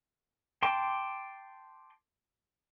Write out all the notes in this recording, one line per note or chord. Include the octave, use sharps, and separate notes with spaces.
G5 A5 C6 D6